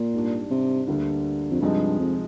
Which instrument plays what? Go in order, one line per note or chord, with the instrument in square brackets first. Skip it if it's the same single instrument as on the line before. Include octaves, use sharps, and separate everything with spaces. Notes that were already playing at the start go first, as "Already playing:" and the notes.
Already playing: [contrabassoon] A#2
[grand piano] G#2 G3 D4
[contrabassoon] C3
[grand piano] D2 D3 G3 A#3 D4
[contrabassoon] F2
[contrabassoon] G2 [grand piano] C3 F3 G#3 D#4
[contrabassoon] F2